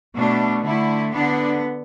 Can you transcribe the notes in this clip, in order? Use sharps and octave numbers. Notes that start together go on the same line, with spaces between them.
B2 A3 D4
D3 A3 E4
D3 B3 D4